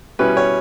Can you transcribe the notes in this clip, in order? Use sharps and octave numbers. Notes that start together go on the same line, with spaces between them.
B2 G3 C#4 E4 B4
C#5